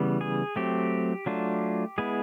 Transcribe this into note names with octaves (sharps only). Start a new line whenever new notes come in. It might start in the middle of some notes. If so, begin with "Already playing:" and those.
Already playing: C#3 E3 G3 B3
G#4
F#3 A3 C4 G4
F#3 A3 D4 F4
G#3 B3 E4 G#4